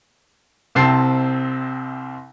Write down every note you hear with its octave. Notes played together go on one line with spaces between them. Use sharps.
C2 C3 C4 A5 C7